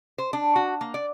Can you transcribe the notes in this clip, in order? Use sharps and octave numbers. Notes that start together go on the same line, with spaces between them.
C5
D4
F#4
A#3
D5